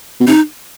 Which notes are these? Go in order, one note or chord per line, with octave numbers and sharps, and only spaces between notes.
B2
C3 D#4